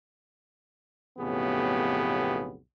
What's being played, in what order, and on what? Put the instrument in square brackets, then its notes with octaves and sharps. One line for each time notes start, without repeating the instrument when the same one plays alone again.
[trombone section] B1 F2 A2 C#3 B3 G4